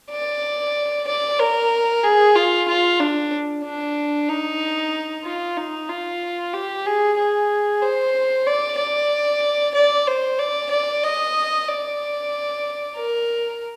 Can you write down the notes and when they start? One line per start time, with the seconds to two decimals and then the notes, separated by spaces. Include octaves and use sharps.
0.11 D5
1.07 D5
1.39 A#4
2.04 G#4
2.36 F4
2.68 F4
3.00 D4
3.64 D4
4.29 D#4
5.25 F4
5.57 D#4
5.89 F4
6.53 G4
6.86 G#4
7.18 G#4
7.82 C5
8.47 D5
8.78 D5
9.74 D5
10.07 C5
10.39 D5
10.71 D5
11.04 D#5
11.68 D5
12.96 A#4